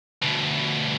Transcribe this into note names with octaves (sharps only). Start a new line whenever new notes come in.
D2 B2